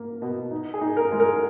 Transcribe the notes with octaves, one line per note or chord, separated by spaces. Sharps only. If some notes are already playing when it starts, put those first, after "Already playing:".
Already playing: A#3
B2
D#4
G#4
D#4
A#4
G#3
A#4